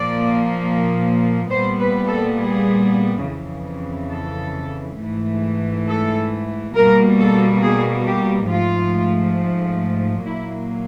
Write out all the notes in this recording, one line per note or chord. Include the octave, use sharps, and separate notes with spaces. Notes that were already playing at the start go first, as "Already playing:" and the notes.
Already playing: A#2 F3 A#3 D5
A#2 G3 B3 C5
B4
A4
G#4
F2 C#3 E3
A4
G#2 E3 A3
A4
B2 G3 A#3 A#4
A4
G#4
G4
G#2 F3 A3 F4
A#2 F#3 A#3 E4